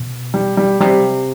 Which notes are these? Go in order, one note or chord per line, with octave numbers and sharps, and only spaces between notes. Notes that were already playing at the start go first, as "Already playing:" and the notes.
Already playing: B2
G3
G3
C3 G3